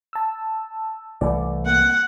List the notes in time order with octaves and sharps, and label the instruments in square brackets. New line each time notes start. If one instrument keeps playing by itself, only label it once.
[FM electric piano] A5 E6
[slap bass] C2 E3 A3 [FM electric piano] D5
[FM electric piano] A#3 [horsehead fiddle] F#5